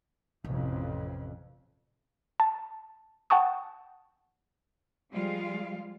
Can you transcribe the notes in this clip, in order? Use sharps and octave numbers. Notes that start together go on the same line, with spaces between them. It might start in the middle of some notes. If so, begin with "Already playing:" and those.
A1 F2 C3
A5
F#5 G5 A5 C#6 D#6
F3 G3 G#3 F4 F5